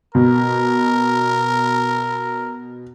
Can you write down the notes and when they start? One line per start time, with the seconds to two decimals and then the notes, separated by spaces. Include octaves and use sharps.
0.15 B2 A#4